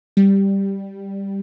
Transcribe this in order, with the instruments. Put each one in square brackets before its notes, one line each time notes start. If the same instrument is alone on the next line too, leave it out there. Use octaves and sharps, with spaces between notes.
[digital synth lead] G3